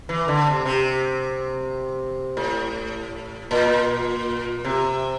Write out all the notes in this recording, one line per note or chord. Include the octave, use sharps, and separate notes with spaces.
E3
D3
C3
C3
A2
A#2
C3